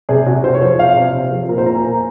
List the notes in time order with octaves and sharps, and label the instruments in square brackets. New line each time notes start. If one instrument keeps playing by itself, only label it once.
[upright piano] C3 G#4
C3 F#4
C4 C5
C#5
F3 C5
C3 F5
C3
C4
F3
A#2 A#4
C5
A#2 A#5
G#5
A#3 A#5